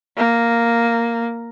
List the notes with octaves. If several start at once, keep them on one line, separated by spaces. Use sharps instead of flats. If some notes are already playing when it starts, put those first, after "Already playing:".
A#3